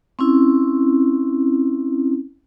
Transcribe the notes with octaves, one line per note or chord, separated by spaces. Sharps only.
C4 C#4 E4